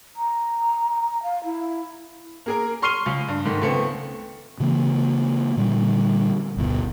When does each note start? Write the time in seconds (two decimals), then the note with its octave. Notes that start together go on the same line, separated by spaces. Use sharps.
0.16 A#5
1.23 F5
1.44 E4
2.46 A#3 G#4 A#4
2.82 C6 C#6 F6 C7 D#7 G7
3.06 C#2
3.28 G2
3.45 G#2 D#3 A3
3.62 C#2 A3 B3 C4
4.60 C#3 E3 A#3
5.57 A#2 D3 G3
6.57 G1 D2 B2